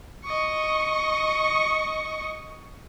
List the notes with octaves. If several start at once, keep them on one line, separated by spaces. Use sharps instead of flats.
D#5 C#6